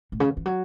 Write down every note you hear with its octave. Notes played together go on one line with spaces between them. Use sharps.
A2
C#3
E3
F#3